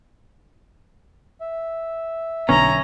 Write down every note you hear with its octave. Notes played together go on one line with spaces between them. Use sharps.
E5
B1 D3 B3 C#4 A#5